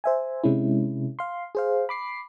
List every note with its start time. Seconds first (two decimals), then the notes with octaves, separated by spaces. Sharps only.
0.04 C5 E5 G#5
0.44 C3 G#3 C#4 E4
1.19 F5 C6
1.55 G#4 C5 F5
1.89 B5 D6 C7